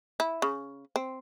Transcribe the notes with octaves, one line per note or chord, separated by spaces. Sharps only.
E4
C#3
C4